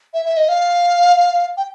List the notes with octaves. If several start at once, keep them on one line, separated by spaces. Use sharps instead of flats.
E5
E5
D#5
F5
G5